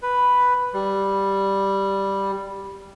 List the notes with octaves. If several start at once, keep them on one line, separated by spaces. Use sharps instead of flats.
B4
G3